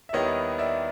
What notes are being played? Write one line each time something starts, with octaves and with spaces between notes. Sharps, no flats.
E5
D#2 D#3 G3 B3 E4 C#5 D#5
D5 E5